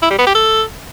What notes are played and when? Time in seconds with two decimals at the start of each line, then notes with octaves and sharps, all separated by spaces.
0.02 E4
0.10 G3
0.19 B3
0.27 G4
0.35 A4